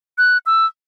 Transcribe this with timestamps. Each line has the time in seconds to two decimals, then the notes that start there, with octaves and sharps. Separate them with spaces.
0.18 F#6
0.46 E6